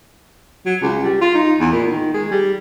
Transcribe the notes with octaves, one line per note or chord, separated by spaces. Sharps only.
F#3
C#2
G3
F4
D#4
E2
A#2
D#3
G#3
G3